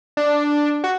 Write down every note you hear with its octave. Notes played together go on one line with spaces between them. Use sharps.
D4
F#4